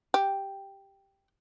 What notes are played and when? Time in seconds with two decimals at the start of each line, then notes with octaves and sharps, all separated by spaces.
0.14 G4